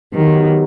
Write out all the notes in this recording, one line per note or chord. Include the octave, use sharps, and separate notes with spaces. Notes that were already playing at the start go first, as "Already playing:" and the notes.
D#3 F#3 B3 D#4 G4